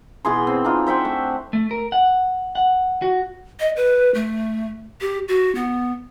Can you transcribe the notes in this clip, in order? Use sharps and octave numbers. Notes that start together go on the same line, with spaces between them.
B2 E3 G#4 C6
C4
D4 D#4 F4
C5 E5 F#5 G5
A3
A3
A#4
F#5
F#5
F#4
D#5
B4
A3
G4
F#4
B3